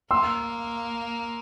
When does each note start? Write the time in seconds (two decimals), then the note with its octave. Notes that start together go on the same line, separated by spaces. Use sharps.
0.11 A#3 C6 E6